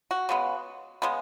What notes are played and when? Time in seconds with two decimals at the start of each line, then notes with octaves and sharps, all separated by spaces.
0.11 F#4
0.29 C#3 G#3 B3
1.02 C#3 G#3 B3